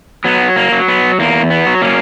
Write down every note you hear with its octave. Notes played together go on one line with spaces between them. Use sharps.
F#3 B3
A#3
F#3
B3
E2 A#3
B3
F#3
A#3 C#4